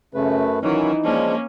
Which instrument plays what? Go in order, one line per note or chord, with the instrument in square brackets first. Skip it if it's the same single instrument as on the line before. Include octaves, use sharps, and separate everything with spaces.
[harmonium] F#2 A3 B4 [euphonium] C#3
[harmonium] D#3 F#3 C#4 [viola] E3 E4 [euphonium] D#4
[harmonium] F3 G#3 D4 [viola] A#3 C#4